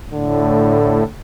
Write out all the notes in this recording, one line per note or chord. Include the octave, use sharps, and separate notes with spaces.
A2 D3